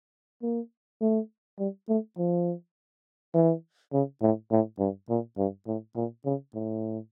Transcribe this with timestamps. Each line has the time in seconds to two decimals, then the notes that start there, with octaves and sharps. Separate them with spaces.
0.43 A#3
1.01 A3
1.59 G3
1.89 A3
2.18 F3
3.34 E3
3.93 C#3
4.22 A2
4.51 A2
4.79 G2
5.10 A#2
5.38 G2
5.67 A2
5.96 A#2
6.25 C#3
6.55 A2